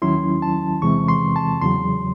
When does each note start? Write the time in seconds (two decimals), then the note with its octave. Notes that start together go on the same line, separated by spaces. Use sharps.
0.02 D#2 D#3 F#3 C#4 E4 C6
0.42 A5
0.82 E2 C3 E3 G#3 C4 C#6
1.08 C6
1.36 A5
1.61 E2 C#3 F#3 C6